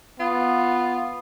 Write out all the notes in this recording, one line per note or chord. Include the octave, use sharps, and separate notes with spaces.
B3 F4